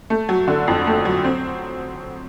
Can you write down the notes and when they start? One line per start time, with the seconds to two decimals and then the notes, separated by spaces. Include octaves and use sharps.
0.10 A3
0.29 F#3
0.48 D3
0.68 F2
0.87 A3
1.05 F#3
1.24 C4